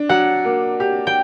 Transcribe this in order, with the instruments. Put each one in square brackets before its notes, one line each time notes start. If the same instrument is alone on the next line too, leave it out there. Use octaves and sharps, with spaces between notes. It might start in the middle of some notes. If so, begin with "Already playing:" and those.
Already playing: [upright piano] D4
[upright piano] F#3 [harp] F#5
[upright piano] A#3
G4
[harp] G5